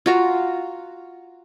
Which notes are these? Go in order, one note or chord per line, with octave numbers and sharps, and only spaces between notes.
F4 F#4 A#5